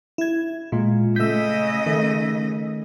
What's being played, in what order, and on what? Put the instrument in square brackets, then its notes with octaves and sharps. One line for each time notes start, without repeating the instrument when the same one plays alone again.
[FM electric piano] E4 G#6
[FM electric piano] A#2 [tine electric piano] G#3 F4
[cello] C#3 D#5 [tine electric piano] A3 G6 [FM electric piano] E6 B6
[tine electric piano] D#3 A3